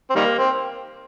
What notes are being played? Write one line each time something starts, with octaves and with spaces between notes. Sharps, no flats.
C4
D#3 G3 A#3
C4